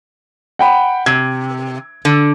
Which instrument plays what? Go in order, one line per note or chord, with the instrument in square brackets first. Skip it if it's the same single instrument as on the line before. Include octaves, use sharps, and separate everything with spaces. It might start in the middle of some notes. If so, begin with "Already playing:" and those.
[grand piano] F#5 G5 B5
[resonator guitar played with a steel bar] C3 [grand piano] G#6
[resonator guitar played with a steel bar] D3